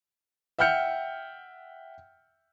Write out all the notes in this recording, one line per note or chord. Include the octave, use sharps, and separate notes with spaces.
E5 F#5 G5 F6 G6 C#7